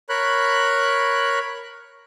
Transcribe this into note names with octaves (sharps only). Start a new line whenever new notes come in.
A#4 C#5 B5 F#6